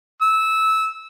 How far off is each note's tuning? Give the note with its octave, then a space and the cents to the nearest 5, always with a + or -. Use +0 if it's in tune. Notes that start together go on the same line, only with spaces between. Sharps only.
E6 -15